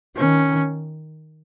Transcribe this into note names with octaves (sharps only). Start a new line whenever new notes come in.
D#3 C#4